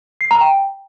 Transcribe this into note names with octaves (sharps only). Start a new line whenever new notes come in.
C7
A#5
G5